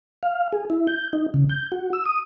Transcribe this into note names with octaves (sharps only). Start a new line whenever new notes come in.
F5
G#4
E4
G6
D#4
C#3
G6
F#4
E6
D#6